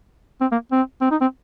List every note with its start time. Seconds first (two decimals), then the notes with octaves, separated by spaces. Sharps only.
0.41 C4
0.52 A#3
0.72 C4
1.01 C4
1.11 D#4
1.21 C4